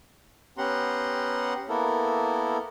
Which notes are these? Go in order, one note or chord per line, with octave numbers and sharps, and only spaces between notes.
B3 C#4 G4 F#5 A#5 C6
A#3 B3 E4 A4 A#4